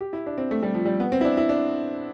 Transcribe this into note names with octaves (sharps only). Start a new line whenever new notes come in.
G4
E4
D4
C4
A3
G3
F3
G3
B3
C4
E4
D4
E4
D4